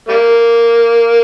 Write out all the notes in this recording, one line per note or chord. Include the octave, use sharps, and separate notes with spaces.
G3 A#3